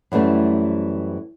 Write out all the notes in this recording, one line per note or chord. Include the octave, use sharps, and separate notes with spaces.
F#2 E3 G3 A3 C4